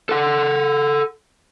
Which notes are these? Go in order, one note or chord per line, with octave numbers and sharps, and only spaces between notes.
A4 F#5